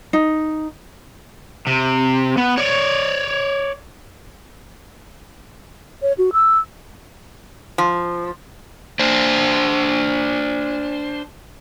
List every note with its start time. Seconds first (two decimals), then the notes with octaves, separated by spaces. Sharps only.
0.13 D#4
1.67 C3
2.38 B3
2.58 C#5 D5
6.02 C#5
6.18 F#4
6.33 E6
7.78 F3
8.99 D4 C5